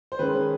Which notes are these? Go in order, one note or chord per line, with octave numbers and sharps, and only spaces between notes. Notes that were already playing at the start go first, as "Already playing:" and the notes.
C5
D#3 G#3 C#4 B4